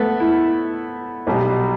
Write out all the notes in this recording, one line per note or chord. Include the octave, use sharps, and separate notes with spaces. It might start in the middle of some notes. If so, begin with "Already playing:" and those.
Already playing: A3 B3
E4
B1 B2 G3